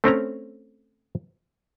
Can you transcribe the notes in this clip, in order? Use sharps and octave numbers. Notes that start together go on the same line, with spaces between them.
A3 C4 C#4 A#5